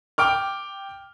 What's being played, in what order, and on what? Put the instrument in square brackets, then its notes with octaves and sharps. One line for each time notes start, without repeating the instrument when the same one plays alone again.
[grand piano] G5 D6 F6